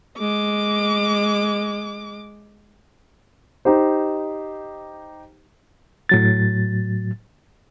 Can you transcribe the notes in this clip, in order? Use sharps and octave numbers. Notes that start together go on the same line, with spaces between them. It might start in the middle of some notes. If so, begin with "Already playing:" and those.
G#3 D6
D#4 G4 C5
A2 F#3 A6